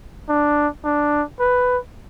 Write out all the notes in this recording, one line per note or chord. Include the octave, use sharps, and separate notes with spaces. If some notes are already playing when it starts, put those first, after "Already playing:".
D4
D4
B4